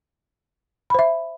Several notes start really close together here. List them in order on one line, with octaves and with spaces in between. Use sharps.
B5 C5 E5